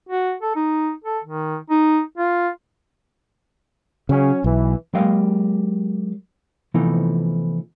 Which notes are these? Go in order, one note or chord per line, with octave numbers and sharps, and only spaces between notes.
F#4
A4
D#4
A4
D#3
D#4
F4
C#3 F#3 C#4
B1 E3
F#3 G#3 A#3 G4 D#5 F5
C3 E3 F3 A3 B3 D#4